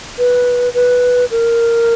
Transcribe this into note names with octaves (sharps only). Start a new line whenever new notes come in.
B4
B4
A#4